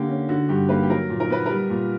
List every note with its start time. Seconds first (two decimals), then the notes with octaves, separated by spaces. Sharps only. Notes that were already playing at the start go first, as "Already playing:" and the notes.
Already playing: D3 A#3 G4
0.09 C#4
0.29 D3 F#4
0.49 G2 G4
0.69 A#3 B4
0.83 G4
0.90 F#3 A#4
1.10 A#2
1.20 A#4
1.30 B3 B4
1.46 G3 A#4
1.70 A#2